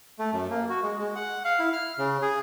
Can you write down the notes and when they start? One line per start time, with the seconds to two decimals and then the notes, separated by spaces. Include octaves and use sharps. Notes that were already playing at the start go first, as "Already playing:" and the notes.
0.19 A3
0.33 F#2
0.50 A#3
0.70 F#4
0.83 G#3
0.99 G#3
1.16 F#5
1.45 F5
1.59 E4
1.73 F6
1.98 C#3
2.22 G#4